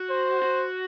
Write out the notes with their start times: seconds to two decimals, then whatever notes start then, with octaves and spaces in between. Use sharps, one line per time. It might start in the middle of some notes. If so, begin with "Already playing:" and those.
Already playing: F#4
0.10 C5
0.42 F#4